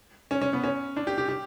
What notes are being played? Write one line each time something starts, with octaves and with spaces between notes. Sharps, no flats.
C#4
C#4
B3
C#4
D4
G4
G4
G4